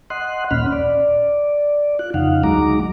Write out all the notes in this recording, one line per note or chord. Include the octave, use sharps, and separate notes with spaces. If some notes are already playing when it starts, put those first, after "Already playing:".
D#5 F#5 C6 F#6
D#2 A#2 C#4 B5 F6
D5
F4 F#6
F2 C#3 D#4 F5 F#5
D2 F#3 G#3 D#4 A#5 D6